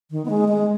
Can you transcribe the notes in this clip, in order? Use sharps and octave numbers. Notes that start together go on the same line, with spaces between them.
D#3
B3
G#3
G#3